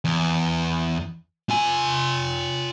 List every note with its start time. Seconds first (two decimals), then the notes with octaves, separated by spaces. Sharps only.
0.05 E2
1.50 F4 G#5